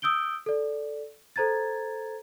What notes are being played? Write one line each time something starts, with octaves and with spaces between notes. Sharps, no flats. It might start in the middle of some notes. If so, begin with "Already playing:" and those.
D#6 E6 G6 D7 G7
A4 D5
A4 C5 A#5 G#6 A6